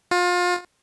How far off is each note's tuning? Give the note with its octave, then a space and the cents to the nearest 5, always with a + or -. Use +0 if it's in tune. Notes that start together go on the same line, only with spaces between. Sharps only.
F4 +30